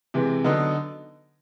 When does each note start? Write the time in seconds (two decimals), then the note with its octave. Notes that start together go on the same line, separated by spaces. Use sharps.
0.14 C3 E3 G#3
0.44 D3 F#3 B3 D#4